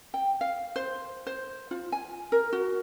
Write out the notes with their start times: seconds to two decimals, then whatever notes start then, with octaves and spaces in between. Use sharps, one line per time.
0.14 G5
0.41 F5
0.76 C5
1.27 C5
1.71 F4
1.92 G#5
2.32 A#4
2.53 F#4